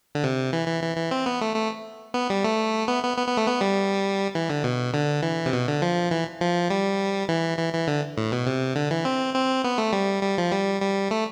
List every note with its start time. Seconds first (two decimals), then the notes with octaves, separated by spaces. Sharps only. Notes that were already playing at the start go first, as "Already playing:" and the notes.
0.15 D3
0.24 C3
0.53 E3
0.67 E3
0.83 E3
0.97 E3
1.11 C4
1.26 B3
1.41 A3
1.55 A3
2.14 B3
2.30 G3
2.44 A3
2.88 B3
3.03 B3
3.17 B3
3.28 B3
3.37 A3
3.47 B3
3.61 G3
4.35 E3
4.50 D3
4.64 B2
4.94 D3
5.23 E3
5.46 C3
5.53 B2
5.68 D3
5.82 F3
6.11 E3
6.41 F3
6.70 G3
7.29 E3
7.58 E3
7.73 E3
7.87 D3
8.18 A2
8.32 B2
8.46 C3
8.76 D3
8.91 E3
9.05 C4
9.34 C4
9.64 B3
9.78 A3
9.93 G3
10.23 G3
10.38 F3
10.53 G3
10.82 G3
11.11 A3